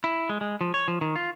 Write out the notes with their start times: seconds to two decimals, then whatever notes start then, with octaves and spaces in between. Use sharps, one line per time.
0.04 E4
0.29 G#3
0.41 G#3
0.61 F3
0.74 C#5
0.88 F3
1.01 D#3
1.16 F4